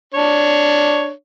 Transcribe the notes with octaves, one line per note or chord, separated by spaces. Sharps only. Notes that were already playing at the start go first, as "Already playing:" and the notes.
D4 C#5